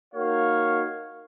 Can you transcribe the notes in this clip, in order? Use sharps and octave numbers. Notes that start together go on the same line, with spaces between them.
A#3 D#4 F#4 C#5 F5